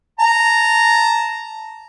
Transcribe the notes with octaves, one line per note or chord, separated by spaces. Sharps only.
A5 A#5